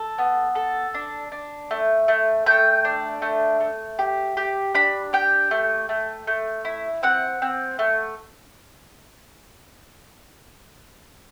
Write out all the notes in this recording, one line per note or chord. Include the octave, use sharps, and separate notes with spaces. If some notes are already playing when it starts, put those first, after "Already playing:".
Already playing: A4
B3
A4
D4
D4
A3
A3
A3 G5
D4
A3
A3
G4
G4
D4 B5
G4 G5
A3
A3
A3
E4
C4 F#5
C4
A3